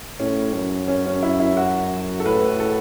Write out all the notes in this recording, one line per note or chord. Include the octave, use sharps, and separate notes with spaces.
A2 C#4
F#2
C#4
C#4
E4
E4
F#4
A4
A2 B4
A4